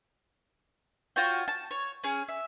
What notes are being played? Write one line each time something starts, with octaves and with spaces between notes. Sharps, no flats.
F4 F#4 C#5 G5
A5
C#5
C#4 G#4
E5